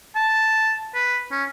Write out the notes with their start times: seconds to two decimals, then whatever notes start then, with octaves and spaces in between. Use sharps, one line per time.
0.16 A5
0.95 B4
1.32 C#4